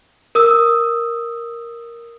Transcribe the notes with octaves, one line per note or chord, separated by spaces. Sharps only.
A#4 D#6 E6